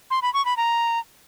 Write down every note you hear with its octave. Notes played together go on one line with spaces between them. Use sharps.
C6
B5
C#6
B5
A#5